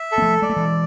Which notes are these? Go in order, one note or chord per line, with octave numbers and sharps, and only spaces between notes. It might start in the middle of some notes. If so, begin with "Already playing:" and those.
Already playing: E5
A4
B3
F3 A3
G#3 D5
A3
E3 G#3